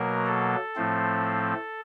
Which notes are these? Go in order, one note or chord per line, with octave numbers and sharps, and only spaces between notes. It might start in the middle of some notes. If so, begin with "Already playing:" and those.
Already playing: B2 F#3 A#3 A#4
A4
A2 F3 A3 C4